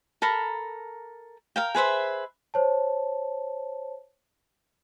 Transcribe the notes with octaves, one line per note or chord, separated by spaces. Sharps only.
A4 A#4 A#5 B5
A#4 F5 G5
G#4 B4 C5 E5
C5 C#5 A5